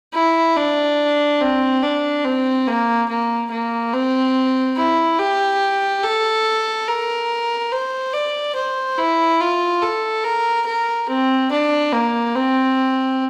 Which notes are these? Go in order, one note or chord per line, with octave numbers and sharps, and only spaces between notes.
E4
D4
C4
D4
C4
A#3
A#3
A#3
C4
E4
G4
A4
A#4
C5
D5
C5
E4
F4
A4
A#4
A#4
C4
D4
A#3
C4